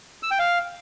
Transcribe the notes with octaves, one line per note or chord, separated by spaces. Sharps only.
E6
G5
F5